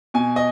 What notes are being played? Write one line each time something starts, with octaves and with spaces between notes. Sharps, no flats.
B2 G#5
D#5